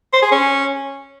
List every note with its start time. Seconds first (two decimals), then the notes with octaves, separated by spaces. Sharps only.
0.13 C5
0.22 G#4
0.32 C#4